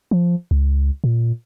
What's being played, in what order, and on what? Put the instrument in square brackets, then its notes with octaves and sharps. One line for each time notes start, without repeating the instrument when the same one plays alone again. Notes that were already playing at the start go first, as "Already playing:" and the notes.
[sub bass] F3
C#2
A#2